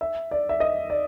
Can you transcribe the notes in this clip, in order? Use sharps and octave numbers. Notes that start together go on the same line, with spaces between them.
E5
D5
E5
D#5
D5